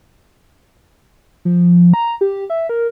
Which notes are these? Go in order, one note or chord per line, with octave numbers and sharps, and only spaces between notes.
F3
A#5
G4
E5
A#4